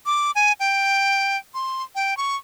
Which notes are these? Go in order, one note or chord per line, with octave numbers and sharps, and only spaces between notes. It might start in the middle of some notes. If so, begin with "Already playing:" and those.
D6
G#5
G5
C6
G5
C#6